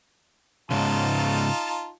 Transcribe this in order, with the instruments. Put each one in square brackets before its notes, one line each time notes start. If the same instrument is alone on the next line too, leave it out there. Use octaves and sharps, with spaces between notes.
[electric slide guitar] G#2 C#3 [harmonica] D#4 F4 A5